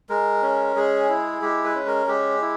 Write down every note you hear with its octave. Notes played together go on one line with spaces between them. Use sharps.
G#3 A#4
C#4
G#3 G#4
E4
G#3 G4
B4
C#4
A#4
G#3 G4
E4